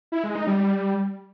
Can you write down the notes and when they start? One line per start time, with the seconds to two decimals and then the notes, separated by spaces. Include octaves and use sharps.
0.12 E4
0.24 G#3
0.35 D#4
0.47 G3